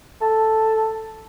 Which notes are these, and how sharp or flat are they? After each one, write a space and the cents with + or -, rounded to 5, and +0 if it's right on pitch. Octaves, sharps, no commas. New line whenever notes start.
A4 +0